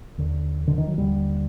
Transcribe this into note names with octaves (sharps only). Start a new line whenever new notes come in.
D#2 D3
D3
D#3
F#3
D#2 D3 G3